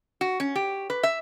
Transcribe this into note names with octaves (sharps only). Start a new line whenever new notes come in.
F#4
C#4
G4
B4
E5